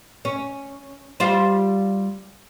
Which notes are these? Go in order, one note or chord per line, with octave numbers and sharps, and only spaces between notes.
C#4
G3 F4 C5